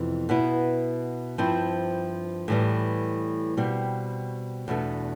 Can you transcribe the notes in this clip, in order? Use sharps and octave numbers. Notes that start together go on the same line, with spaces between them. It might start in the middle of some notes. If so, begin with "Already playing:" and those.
Already playing: F2 C3 E3 B3
B2 B3 E4
G2 F3 C4 E4
A2 E3 G3
B2 G3 C4
E2 B2 A3 D4